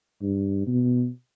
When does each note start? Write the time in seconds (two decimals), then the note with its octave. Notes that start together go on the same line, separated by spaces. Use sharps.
0.22 G2
0.67 B2